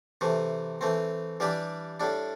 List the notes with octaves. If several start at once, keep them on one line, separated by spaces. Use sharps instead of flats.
C3 E3 A3
E3 A3 C4
E3 G3 D4 G4
A2 G3 D4